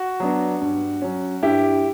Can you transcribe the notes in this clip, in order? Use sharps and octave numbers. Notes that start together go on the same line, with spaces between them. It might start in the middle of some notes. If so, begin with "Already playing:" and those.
Already playing: F#4
F#3 B3 D4
G2
F#3 C#4
G2 E4 G4